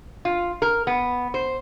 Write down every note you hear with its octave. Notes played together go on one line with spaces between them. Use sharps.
F4
A#4
B3
C5